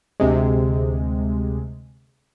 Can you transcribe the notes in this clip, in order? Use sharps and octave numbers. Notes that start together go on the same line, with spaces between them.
D2 C3 G#3